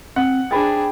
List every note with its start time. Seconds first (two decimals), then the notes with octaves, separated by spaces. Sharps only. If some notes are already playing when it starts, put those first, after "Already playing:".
0.16 C4 F#5
0.51 D4 G#4 C5 G5 B5 A6